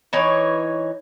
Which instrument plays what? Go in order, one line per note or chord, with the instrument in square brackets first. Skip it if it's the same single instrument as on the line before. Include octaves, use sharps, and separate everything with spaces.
[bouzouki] E3 D#4 C#5